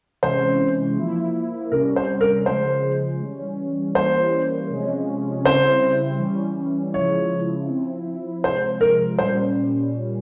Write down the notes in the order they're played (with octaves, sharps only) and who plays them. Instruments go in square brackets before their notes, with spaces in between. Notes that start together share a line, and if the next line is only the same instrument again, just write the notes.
[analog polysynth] C3 E3 G#3 C#4 [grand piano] C5
[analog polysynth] F3 A#3 E4
[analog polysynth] C3 G3 C#4 [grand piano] A#4
[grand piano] C5
A#4
[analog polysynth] C#3 F3 G#3 [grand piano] C5
[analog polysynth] E3 G3 C#4
[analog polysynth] E3 G3 A#3 C#4 [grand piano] C5
[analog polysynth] C3 F3 G#3 C#4
[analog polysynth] C#3 G3 C4 E4 [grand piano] C5
[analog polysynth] E3 G3 C#4
[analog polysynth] C#3 F3 G#3 E4 [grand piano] C#5
[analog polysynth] F3 C4 E4
[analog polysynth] C3 F3 G#3 [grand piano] C5
[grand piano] A#4
[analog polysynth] A#2 G3 C#4 [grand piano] C5